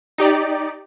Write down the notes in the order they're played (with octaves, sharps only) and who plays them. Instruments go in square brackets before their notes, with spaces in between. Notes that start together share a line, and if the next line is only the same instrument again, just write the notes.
[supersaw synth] D#4 G4 D5